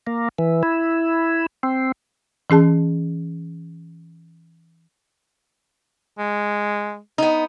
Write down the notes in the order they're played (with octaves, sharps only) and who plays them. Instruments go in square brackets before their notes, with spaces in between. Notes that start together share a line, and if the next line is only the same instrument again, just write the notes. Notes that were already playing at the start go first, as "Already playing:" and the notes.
[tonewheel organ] A#3
E3
E4
C4
[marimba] E3 C#4 G#4 A5
[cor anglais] G#3
[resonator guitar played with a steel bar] B3 D#4